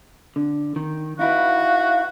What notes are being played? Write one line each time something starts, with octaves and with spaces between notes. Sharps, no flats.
D3
D#3
D#4 E4 F#4 B4 F5